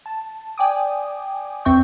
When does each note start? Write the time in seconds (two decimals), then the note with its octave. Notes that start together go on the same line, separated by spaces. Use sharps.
0.06 A5
0.58 D5 G5 G#5 D6 D#6
1.65 E2 C4 E5 G5 C#6 G6